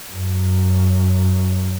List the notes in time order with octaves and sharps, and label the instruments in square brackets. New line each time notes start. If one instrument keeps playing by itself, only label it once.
[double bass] F#2